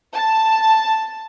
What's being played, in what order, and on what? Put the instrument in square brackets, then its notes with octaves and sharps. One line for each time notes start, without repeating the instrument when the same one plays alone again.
[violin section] A5